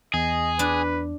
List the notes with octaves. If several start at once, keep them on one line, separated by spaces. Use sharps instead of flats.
E2 G#4 D#5
D4 B4